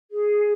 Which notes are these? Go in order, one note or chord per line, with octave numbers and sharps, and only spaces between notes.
G#4